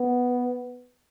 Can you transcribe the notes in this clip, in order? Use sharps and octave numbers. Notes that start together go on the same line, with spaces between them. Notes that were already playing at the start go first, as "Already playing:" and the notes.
Already playing: B3